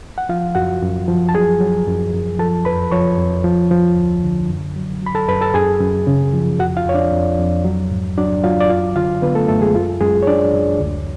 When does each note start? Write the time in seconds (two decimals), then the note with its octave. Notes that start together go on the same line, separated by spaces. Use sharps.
0.18 F#5
0.29 F3 F4 F5
0.55 F#2 F#4 F#5
0.82 F#2
1.08 F3
1.29 A5
1.34 F#3 G#4 G#5
1.61 F#3
1.87 F#2
2.13 F#2
2.39 F3 A4 A5
2.65 F2 B4 B5
2.92 F3 C#5 C#6
3.18 F2
3.44 F3
3.71 F3
3.96 D2
4.23 D3
4.50 F#2
4.76 F#3
5.02 F#3 B5
5.15 A4 A5
5.28 F#2 B4 B5
5.41 A4 A5
5.54 F#2 G#4 G#5
5.81 F#2
6.07 C#3
6.33 F3
6.59 F2 F#4 F#5
6.77 F4 F5
6.85 F2 C#5
6.94 D4 D5
7.12 F2
7.39 F2
7.65 F#3
7.91 G#2
8.17 F#3 D4 D5
8.44 F#3 F4 F5
8.61 D5
8.70 F#2 F4 F5
8.96 D3 F4 F5
9.22 D3 B3 B4
9.35 A3 A4
9.49 F#2 A3 A4
9.62 G#3 G#4
9.75 F#2 F4
10.01 F#2 G#3 G#4
10.23 C#5
10.27 F#2 D4 D5
10.53 F#2
10.80 D2